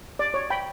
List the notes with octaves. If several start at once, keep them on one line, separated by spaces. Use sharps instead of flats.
D5
C#5
G5 B5